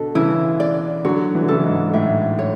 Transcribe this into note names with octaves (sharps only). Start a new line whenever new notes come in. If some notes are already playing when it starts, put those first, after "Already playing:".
Already playing: B2 D3 A4
C#3 E3 E4
D5
D3 F#3 F#4
E3
D3
C#3 E3 A4
G#2
A2 E5
C#5